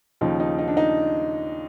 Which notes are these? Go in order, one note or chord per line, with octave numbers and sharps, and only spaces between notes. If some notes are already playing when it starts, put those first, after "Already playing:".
D#2 C#3 F3 D#4
D#4
D#4
D4
D#4